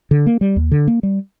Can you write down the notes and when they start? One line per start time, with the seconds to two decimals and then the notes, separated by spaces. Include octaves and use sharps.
0.11 D3
0.27 A#3
0.41 G3
0.56 D#2
0.71 D3
0.87 A#3
1.03 G3